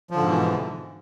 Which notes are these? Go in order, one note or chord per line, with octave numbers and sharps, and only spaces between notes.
G#2 B2 D3 E3 F3